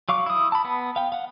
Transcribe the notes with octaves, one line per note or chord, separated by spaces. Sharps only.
F#3 F5 C#6 D6
E4 D#6
A5 B5
B3
F5 G5
F5 F#5